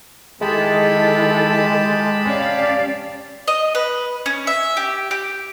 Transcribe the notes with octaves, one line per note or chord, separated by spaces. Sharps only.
D#3 G#3 E4 G4 A4 A5 B5
C#4 D5 F5
D#5
B4
C#4
E5
G4
G4